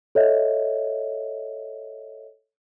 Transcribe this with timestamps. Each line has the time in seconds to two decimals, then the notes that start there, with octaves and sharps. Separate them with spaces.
0.15 A4 C#5 D#5 E5